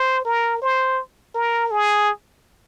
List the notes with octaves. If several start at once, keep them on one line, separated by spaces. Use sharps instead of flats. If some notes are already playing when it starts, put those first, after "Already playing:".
Already playing: C5
A#4
C5
A#4
G#4